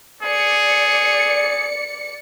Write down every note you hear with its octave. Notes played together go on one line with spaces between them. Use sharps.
G#4 D5 C#7